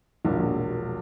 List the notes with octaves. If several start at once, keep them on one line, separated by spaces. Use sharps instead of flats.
E1 A#1